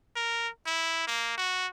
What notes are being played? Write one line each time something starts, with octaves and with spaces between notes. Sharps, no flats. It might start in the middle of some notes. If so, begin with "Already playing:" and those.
A#4
E4
A#3
F#4